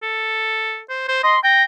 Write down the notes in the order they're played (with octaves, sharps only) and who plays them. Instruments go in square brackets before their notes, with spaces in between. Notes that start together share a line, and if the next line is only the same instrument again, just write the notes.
[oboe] A4
C5
C5
[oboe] D#5 [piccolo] C6
[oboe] G5 [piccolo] A#6